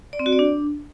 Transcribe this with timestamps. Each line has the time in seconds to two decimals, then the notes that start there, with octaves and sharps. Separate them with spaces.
0.13 D5
0.19 C4
0.26 F#4
0.32 D5
0.39 D4